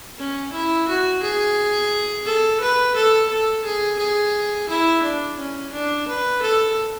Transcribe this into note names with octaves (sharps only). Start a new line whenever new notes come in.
C#4
E4
F#4
G#4
A4
B4
A4
A4
G#4
G#4
E4
D4
C#4
D4
B4
A4